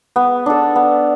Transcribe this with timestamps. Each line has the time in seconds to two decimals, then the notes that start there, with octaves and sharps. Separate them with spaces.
0.16 B3
0.46 D4 A4
0.75 B3